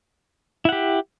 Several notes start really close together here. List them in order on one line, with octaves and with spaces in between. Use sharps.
E4 F#5 G4